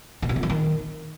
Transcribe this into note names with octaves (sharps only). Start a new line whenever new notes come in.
B2
C3
F2
F3
D#3